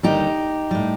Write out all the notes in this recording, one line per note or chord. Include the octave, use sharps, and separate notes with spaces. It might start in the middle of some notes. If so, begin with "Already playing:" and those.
D#2 D3 G3 D#4 G4
A2 G3